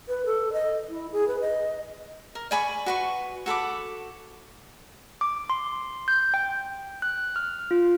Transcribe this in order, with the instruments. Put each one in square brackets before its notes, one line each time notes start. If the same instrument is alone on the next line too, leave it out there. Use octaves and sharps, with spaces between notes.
[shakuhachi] B4
A4
D#5
E4
G#4
B4
D#5
[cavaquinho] A#4
D5 G#5 B5 C#6
F#4 B4 C#6
F#4 A4 B5 D6
[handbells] D6
C6
G6
G5
F#6
F6
F4